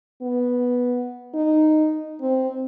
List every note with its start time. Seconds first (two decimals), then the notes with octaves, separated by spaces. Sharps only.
0.22 B3
1.35 D#4
2.21 C4